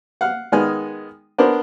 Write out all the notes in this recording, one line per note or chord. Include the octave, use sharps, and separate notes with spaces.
F5 F#5
D#3 G#3 B3 G#5 F6
B3 D4 A#4 C5